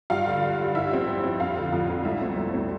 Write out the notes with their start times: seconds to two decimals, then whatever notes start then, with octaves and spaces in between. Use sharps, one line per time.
0.10 G2 F4 F5
0.27 D3 G3
0.42 G2
0.59 D3 G3
0.75 G2 E4 E5
0.92 F3 C4
1.07 G2
1.24 F3 C4
1.40 F2 F4 F5
1.56 D3 F3
1.72 F2
1.88 D3 F3
2.05 C2 E4 E5
2.21 B2 A3 C4
2.37 C2
2.54 B2 A3 C4